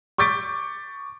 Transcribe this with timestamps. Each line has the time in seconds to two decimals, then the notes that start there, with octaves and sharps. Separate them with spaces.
0.18 C#6 D6 G6 A6 B6 D7